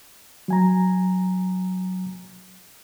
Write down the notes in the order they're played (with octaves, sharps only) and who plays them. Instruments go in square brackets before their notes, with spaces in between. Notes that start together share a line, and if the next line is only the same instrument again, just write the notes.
[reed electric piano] F#3 G#5 A#5